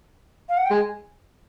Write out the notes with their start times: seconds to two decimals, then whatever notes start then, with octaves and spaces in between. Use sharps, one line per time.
0.49 F5
0.57 F#5
0.65 G5
0.70 G#3 G#5